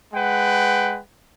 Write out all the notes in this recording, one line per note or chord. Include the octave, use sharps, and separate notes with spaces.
G#3 B4 F#5 G5